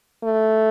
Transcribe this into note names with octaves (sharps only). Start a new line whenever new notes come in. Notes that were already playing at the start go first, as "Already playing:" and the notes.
A3